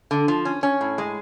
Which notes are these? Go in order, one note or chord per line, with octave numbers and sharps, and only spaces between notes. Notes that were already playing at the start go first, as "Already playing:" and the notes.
D3
F3
C#4
C#4
A2
G#3